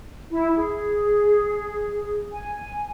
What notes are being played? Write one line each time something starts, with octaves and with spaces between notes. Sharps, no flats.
E4
G#4
G#5